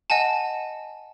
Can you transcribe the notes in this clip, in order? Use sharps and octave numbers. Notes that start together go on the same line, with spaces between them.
D#5 F#5 G#5 A5